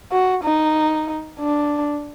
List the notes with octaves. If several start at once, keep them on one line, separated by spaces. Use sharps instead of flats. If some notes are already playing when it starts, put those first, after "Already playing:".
F#4
D#4
D4